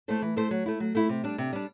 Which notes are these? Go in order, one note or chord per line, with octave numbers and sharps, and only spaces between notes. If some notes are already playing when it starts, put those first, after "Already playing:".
A3 E4 A4 C5
E3
A3 E4 A4 C5
F#3
A3 E4
F#3
A3 E4
C3
G3 D4
C3
G3 D4